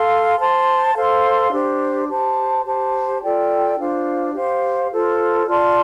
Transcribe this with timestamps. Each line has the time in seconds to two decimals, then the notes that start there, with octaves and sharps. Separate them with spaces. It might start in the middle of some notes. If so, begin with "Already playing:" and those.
Already playing: A4 F5 C6
0.39 C5 A5 C6
0.95 A4 C5 F5 C6
1.52 D4 G4 C5
2.08 G4 C5 A5
2.65 G4 C5 A5
3.21 F4 A4 D5 G5
3.78 D4 F4 C5 F5
4.34 G4 C5 F5
4.91 F4 A4 C5
5.47 F4 D5 A5 C6